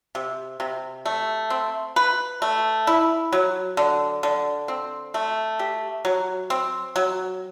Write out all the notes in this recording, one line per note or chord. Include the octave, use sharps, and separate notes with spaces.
C3
C3
A3
C4
B4
A3
E4
F#3
D3
D3
C4
A3
G4
F#3
C4
F#3